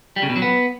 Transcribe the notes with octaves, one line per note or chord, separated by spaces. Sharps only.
G3
C#3
B2
F#3
B3